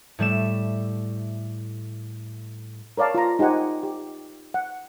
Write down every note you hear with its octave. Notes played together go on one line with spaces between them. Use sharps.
A2 G3 A3 E7
A#4 C#5 D5 F5 A5
F4 A#5
D#4 G4 C5 F#5 G#5
G4
F#5